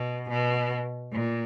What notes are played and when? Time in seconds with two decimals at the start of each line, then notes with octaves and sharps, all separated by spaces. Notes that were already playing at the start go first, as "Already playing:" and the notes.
Already playing: B2
0.29 B2
1.13 A#2